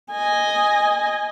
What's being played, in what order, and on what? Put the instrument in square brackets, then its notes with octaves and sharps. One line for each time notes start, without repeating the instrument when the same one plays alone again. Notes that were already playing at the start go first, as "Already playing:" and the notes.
[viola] D#5 G#5